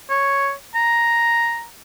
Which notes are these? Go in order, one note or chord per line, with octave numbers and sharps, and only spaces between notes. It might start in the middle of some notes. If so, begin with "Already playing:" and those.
C#5
A#5